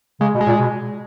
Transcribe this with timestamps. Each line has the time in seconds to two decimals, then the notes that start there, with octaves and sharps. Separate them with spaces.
0.21 C#3 G#3
0.34 B2
0.41 G#3
0.47 A#2
0.60 B2